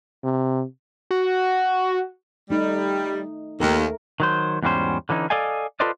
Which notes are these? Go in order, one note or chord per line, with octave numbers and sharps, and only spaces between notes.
C3
F#4
G3 A3 D#4
D#2 A3 A#4
D#3 F#3 C5
E2 G#2 F#3 G3 C#4 C5
D3 E3 C#4 D#4
A4 D5 D#5 F5 G#5
F4 A4 B4 C5 D5 D#5